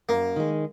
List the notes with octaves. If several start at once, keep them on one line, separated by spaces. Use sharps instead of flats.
F#2 A#3
D#3 G#3